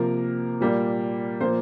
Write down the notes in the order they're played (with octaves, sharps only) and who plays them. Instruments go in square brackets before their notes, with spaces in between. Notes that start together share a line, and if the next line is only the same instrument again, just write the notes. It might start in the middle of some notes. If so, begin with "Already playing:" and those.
Already playing: [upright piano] C3 F3 A#3 A#4
A#2 G3 A#3
A#2 F3 A#3 C5